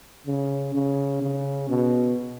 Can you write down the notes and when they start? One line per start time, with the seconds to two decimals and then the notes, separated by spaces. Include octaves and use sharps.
0.27 C#3
0.75 C#3
1.22 C#3
1.69 B2